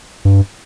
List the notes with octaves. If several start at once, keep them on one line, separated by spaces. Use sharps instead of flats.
G2